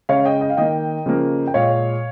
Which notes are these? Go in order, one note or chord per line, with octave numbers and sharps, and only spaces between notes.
C#3 G#3 C#5 F5
D#5 G5
D#5 G5
F5
D#3 A#3 D#5 G5
C#3 F3 A#3
G5
A#2 G#3 C#5 F5